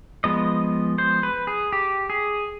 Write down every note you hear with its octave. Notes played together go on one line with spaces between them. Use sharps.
F3 G#3 B3 D#5
C5
B4
G#4
G4
G#4